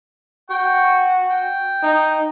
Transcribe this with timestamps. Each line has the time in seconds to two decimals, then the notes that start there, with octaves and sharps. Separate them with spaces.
0.50 F#4 G5 C#6
1.29 G5
1.83 D#4